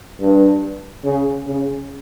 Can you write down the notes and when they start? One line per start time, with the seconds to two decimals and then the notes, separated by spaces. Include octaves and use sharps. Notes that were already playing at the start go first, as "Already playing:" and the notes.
0.20 G2
1.05 C#3
1.47 C#3